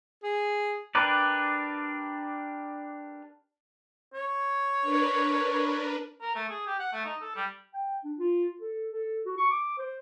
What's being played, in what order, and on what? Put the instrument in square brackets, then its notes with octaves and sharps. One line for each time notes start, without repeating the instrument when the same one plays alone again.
[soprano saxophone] G#4
[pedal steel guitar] D4 G4 A#4 B4 D5
[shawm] C#5
[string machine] D4 A#4 B4
[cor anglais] A#4
A3
G#4
G4
F#5
A3
D#4
A4
G3
[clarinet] G5
D4
F4
A4
A4
F#4
C#6
D6
C5